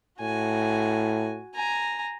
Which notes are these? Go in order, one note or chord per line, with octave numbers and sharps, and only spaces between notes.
A2 F#4 G#5
G#5 A#5